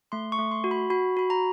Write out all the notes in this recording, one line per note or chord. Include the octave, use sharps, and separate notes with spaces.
A3 C6
C#6
A3
C6
F#4
B5
F#4 B5
F#4 B5
A#5